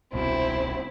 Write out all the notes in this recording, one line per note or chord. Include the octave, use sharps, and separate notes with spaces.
D#1 C2 B2 C4 E4